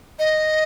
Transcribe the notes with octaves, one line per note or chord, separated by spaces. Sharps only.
D#5